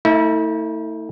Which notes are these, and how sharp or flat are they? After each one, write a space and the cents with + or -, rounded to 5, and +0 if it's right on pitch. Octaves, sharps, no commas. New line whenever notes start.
A3 +30 E4 -40